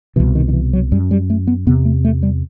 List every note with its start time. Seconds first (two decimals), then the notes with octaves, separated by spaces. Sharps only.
0.16 B2 E3
0.20 C2
0.35 D#3
0.48 D#3
0.53 E3
0.73 F#3
0.92 F#2 G3
1.11 G3
1.30 A3
1.47 B3
1.67 E2 C3 B3
1.85 A3
2.05 A3
2.23 G3